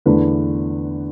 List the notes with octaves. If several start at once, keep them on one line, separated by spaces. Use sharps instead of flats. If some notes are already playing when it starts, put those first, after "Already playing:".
E2 D3 A3 D4 B4